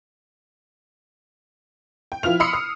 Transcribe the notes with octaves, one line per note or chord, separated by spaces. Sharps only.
G5
F3 E4 F4 F6 F7
B5 C6 D#6 E6 C7 C#7
F6